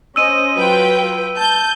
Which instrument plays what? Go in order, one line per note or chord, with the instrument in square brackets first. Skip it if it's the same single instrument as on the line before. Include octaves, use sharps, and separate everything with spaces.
[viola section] C#4 C5 D#5 [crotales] E6 D#7
[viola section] F#3 F4 [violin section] B4 G5
[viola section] A5 [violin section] G6